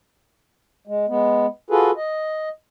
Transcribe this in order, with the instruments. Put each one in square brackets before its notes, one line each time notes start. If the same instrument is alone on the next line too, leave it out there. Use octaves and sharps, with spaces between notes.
[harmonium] G#3
G#3 B3
F4 F#4 G#4 A4 B4
D#5